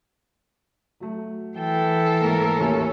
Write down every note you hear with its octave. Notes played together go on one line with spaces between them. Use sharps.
F#3 A3
E3 A4 G5
G#2 A3 A#3 A#4
D#2 A2 C#4